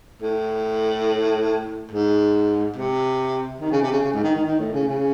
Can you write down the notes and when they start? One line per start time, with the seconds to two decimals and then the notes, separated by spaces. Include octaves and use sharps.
0.22 A2
1.91 G#2
2.76 C3
3.61 D#3
3.72 C#3
3.82 C3
3.92 C#3
4.03 C#3
4.13 G#2
4.24 D#3
4.35 D#3
4.46 D#3
4.60 A2
4.73 C#3
4.88 C#3